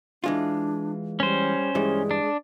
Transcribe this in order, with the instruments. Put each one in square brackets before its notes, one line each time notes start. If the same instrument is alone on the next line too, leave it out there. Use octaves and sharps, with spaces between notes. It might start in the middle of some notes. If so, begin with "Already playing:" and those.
[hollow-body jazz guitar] E3 G#3 F4 [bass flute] D4
[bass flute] G3 [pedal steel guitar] C#4 C5
[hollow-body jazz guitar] G2 E3 G3 [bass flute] G#3
[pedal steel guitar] D4